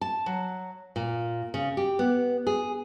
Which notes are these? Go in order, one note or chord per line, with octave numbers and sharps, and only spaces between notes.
A5
F#3
A#2
C#3
G4
B3
G#4